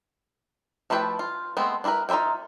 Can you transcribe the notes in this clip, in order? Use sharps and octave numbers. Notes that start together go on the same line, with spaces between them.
F3 A3 E4 B4 G5
F4
G#3 A3 B3 C4
D4 E4 F#4 A#4 B4
D#4 F4 C5 E5 G5